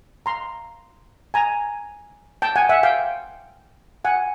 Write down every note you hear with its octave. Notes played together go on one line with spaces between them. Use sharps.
A#5 C6
G#5 A#5
G5 A5
F#5 G#5
E5 F#5
F5 G5
F#5 G#5